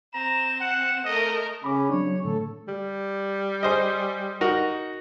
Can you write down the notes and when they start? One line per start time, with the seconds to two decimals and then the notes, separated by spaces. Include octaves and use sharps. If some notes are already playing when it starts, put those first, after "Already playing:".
0.14 C4 A#5 E7
0.60 F#5
1.05 A3 A#4 D#5
1.64 C#3 C#4 B5 D6
1.89 F#3 C4 D4 C#5
2.25 A2 D3 A3 A4
2.68 G3
3.63 G#4 C5 D#5
4.41 D#4 F#4 A#4